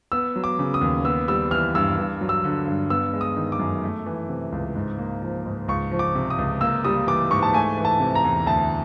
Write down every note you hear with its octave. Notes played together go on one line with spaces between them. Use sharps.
B3 E6
F#3
D6
C#3
D#6
D#2
B3 E6
G3 E6
E3 F6
G2 E6
G2
F#3
E6
D3
G2
B3 E6
G#3
D#6
D#3
D6
F#2
A3
E3
C3
C#2
G#2
A#3
F3
G#2
C#2 C#6
F3
D6
C3
D#6
C#2
A#3 E6
G3 D#6
E3 D6
G#2 C#6
A5
A3 G#5
E3
A5
C3
A#5
E2
D2 A5